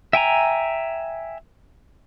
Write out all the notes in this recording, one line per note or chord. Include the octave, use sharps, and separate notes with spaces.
E5 G5 G#5 A#5